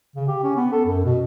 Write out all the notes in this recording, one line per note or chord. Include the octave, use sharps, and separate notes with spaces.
C#3
G4
C#4
B3
A4
F#2
B2